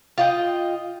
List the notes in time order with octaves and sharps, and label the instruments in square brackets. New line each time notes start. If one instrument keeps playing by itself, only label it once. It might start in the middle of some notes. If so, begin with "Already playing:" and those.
[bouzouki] F4 D#5 G5